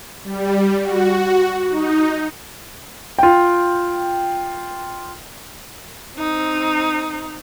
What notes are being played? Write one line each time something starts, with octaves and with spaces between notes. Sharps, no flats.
G3
F#4
D#4
F4 G5
C4 D#4